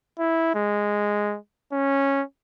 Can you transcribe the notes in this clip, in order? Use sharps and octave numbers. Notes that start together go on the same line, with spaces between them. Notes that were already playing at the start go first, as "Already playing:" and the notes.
E4
G#3
C#4